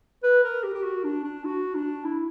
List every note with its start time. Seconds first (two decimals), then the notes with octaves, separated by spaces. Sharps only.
0.23 B4
0.44 A#4
0.63 G4
0.74 G4
0.84 F#4
1.04 D4
1.24 D4
1.45 F#4
1.74 D4
2.04 E4